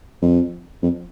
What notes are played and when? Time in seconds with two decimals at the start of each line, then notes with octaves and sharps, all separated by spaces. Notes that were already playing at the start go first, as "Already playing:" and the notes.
0.22 F2
0.82 F2